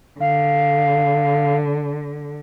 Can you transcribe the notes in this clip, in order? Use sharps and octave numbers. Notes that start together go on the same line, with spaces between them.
D3 F5